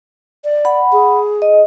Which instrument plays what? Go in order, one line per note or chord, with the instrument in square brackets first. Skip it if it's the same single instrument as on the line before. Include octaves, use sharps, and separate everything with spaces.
[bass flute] D5
[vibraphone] F#5 B5
[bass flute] G#4
[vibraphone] D#5